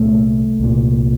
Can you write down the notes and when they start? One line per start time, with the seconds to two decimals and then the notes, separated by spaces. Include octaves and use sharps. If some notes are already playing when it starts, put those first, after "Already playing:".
Already playing: C2 A#2 A3
0.60 C2 A#2